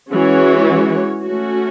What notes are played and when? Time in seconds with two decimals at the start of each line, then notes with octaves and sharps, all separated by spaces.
0.11 E3 G#3 C#4 F#4 C#5
1.24 A3 C#4 F#4